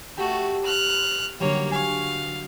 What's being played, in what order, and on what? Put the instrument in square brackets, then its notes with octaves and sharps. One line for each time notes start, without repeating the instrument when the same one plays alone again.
[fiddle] A3 F#4 [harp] G4
[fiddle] F6 F#6
[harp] D3 F#3 G3 [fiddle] A#3 C#5
[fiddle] F5 [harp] G#5 C#6